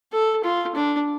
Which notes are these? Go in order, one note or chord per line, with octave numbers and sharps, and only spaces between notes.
A4
F4
D4